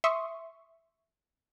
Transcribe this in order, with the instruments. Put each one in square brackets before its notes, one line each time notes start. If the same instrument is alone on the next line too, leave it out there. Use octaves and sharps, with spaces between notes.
[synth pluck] E5 C6 C#6 D#6